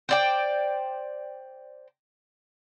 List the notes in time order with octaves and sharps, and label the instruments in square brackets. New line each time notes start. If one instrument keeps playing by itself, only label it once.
[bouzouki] C5 D5 G5